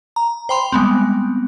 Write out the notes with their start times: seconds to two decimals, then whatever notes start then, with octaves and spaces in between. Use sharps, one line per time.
0.16 A#5
0.49 C5 G5 B5 C6 F7
0.72 G3 G#3 B3 C4